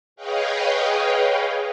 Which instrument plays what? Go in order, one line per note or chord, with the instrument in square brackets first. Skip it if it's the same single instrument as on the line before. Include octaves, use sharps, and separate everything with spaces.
[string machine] G#4 B4 C#5 D#5 F5 G5